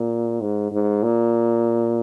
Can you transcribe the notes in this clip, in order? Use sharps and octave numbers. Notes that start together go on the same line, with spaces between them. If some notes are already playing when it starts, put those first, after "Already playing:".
Already playing: A#2
G#2
G#2
A#2